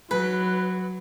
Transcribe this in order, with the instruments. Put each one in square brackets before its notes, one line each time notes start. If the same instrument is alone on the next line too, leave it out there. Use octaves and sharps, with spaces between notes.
[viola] F#3 [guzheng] B4